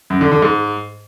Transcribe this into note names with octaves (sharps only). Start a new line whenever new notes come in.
F#2
D3
D3
G#2